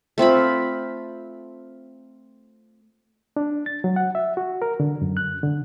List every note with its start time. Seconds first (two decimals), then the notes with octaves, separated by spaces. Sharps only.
0.18 A3 C4 F4 B5
3.37 D4
3.66 A6
3.84 F#3
3.96 F#5
4.15 E5
4.37 F#4
4.62 A#4
4.80 D3
5.02 F#2
5.17 F#6
5.43 D3